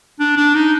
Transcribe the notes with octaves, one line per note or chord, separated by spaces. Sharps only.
D4
D4
D#4